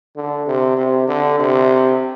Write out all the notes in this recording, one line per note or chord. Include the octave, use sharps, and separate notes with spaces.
D3
C3
C3
D3
C3